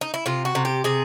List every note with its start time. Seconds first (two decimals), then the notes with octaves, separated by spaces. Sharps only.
0.01 D#4
0.14 E4
0.26 C3 F4
0.45 F#4
0.55 C3
0.65 G4
0.84 C3 G#4